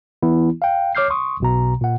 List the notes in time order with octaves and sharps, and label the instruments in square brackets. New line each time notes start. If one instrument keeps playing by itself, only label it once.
[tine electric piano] E3 B3 E4
F5 G5
C#5 D6 F6 G6 C7
C6 C#6 D#6
B1 B2 A#5
A#2 F#5